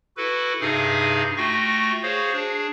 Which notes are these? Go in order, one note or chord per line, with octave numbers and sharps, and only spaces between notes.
E4 F#4 A4 B4
G2 C3 D#4 G#4 F5 G#5
A3 F4 F#4 G5 C#6 A#6
F#4 G#4 C5 C#5 F5
D4 G#4